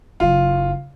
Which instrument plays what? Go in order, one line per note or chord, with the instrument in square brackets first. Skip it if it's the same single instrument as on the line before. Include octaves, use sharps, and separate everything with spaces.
[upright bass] F#1 F#3 [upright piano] F4